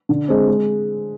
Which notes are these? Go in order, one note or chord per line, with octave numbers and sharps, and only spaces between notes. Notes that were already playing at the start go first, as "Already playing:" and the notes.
D3
G#3 C4
G#3